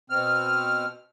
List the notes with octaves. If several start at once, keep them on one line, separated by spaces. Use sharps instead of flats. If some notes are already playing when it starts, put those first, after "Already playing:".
B2 C4 F6